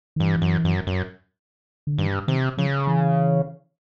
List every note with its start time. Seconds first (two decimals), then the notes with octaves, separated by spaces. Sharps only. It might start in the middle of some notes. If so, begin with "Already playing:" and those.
0.16 D#3
0.20 G2 E3
0.42 F#2
0.65 F#2
0.87 F#2
1.87 D3
1.98 G2 D#3
2.28 C3 D#3
2.58 C#3 F3
2.87 E3